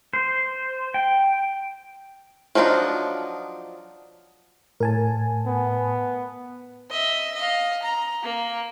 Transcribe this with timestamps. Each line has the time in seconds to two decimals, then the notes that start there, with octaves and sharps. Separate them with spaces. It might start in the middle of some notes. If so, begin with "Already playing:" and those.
0.13 C5
0.94 G5
2.55 F3 F#3 D4 D#4 F4
4.80 A2 A#4 G#5 A5
5.47 B3
6.90 D#5 E5
7.35 D#5 F5
7.83 A#5
8.22 A#3